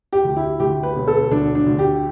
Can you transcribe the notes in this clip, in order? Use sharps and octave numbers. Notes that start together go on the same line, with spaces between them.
G4
D2
E4
D2 G4
B4
E1
A4
D2 D4
D4
D2
G4